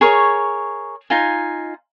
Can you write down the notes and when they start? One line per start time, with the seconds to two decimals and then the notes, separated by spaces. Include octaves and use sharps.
0.01 G#4 A#4 C#5 C#6
1.10 D#4 F4 G#5